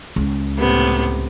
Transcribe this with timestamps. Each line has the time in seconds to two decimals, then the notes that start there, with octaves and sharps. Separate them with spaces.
0.16 C#2
0.57 A2 C3 B3